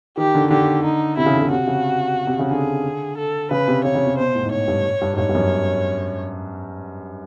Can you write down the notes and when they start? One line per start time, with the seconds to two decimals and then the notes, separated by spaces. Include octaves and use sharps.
0.17 D#3 G4
0.35 D3
0.51 D3 G4
0.85 D#4
1.17 C3 E4
1.26 C#3
1.34 D3
1.42 C#3
1.51 C3 F#4
1.67 C#3
2.27 C3
2.39 C#3
2.51 D3 G#4
3.18 A4
3.51 C#3 B4
3.68 C3
3.84 C#3 C#5
3.95 C#3
4.07 C3
4.17 B2 C5
4.35 A2
4.43 G#2
4.51 C#5
4.68 G2
5.01 G2
5.13 G#2
5.18 G2 C#5
5.29 G2
5.35 F#2